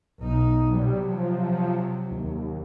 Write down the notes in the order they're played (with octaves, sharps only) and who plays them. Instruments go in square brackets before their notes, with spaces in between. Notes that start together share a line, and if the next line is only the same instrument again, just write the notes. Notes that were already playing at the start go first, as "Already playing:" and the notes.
[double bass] B1 D#4
[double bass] C3 F#3 [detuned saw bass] G3
[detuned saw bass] F3
D#2